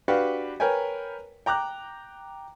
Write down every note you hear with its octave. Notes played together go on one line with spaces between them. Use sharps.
D4 F#4 G4 B4 F5 F#5
A#4 B4 C#5 G5 G#5
G5 A#5 D6 F#6